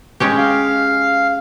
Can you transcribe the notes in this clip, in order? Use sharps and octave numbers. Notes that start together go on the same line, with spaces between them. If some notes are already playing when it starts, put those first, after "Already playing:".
G#3 C#4 G4
F5